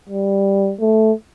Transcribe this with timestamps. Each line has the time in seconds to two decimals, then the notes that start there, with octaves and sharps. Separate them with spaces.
0.09 G3
0.81 A3